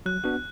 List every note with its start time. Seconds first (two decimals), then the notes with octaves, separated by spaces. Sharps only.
0.06 F#3 F#6
0.24 B3 D4 F#4 F#6